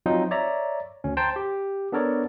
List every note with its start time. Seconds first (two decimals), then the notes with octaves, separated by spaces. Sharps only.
0.06 F3 F#3 C4 D#4 F4
0.31 C#5 D5 E5 A#5
1.04 D2 C#4
1.17 C5 G5 A5 A#5 C6
1.36 G4
1.92 B3 D4 A4 A#4 C#5 D5